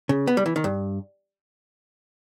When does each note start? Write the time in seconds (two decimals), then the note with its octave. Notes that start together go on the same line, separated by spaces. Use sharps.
0.09 C#3
0.27 B3
0.37 G3
0.46 E3
0.56 D#3
0.64 G2